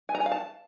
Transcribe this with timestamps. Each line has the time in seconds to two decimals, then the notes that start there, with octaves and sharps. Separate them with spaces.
0.09 G#5
0.15 A#5
0.20 G#5
0.26 F5
0.32 A5